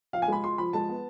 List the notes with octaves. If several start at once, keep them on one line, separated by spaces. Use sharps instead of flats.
F3 F5
G#5
G#3 B5
F4 C6
F3 B5
G#3 A5
B3